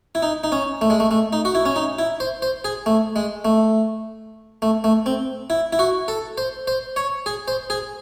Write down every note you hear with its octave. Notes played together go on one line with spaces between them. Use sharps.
E4
D#4
D#4
C#4
A3
G#3
A3
A3
D#4
F#4
E4
C#4
D#4
E4
C5
C5
G#4
A3
G#3
A3
A3
A3
C4
E4
E4
F#4
A4
C5
C5
C#5
G#4
C5
G#4